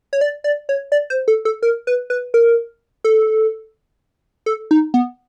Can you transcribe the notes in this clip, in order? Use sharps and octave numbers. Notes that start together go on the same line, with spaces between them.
C#5
D5
D5
C#5
D5
C5
A4
A4
A#4
B4
B4
A#4
A4
A4
D#4
B3